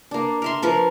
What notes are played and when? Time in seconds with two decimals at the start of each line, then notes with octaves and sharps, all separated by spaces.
0.11 A#3 D4
0.42 A#4 E5 C6
0.62 F3 A#4 B4